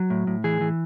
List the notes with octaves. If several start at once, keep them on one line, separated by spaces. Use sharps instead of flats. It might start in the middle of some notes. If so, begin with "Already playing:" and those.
Already playing: F#3
A2
A2
E3 G#4
E3